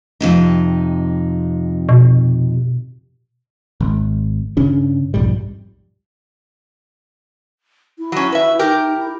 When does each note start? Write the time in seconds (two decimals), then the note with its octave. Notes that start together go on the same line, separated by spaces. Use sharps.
0.21 F2 C3 D#4
1.89 B2
3.80 G#1
4.57 G2 C#3 C#4 D4
5.14 B1 F2 G#2 G3
7.98 E4
8.12 F#3 C#4
8.32 B4 E5
8.59 D#4 G4 A#4
8.97 E4